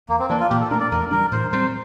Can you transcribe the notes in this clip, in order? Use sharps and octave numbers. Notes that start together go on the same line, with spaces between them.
E2 A#3
C4
E3 A#3 D4
F4
A#2 G4
A4
A3 D4 A#4
D5
E2 A#4
E3 G3 D4 A#4
A2 C5
G3 C4 C5